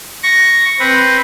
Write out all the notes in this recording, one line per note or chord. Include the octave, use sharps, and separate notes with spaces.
C#6 A#6
C4 B4